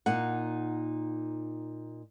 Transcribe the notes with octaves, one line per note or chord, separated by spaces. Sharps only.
A#2 D#4 F#5